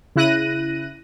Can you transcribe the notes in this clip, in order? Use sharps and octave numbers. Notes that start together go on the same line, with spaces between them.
C#3 E4 F#6 A#6 D#7